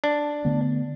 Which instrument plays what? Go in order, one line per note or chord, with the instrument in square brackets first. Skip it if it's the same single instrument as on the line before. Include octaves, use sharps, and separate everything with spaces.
[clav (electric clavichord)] D4
[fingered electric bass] D3 A3 B3